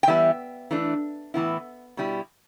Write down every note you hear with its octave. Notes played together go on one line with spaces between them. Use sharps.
G5
E3 G3 B3 E4 E5
E3 A3 D4
A2 E3 B3 E4
B2 G3 E4